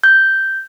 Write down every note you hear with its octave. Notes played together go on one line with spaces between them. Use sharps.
G6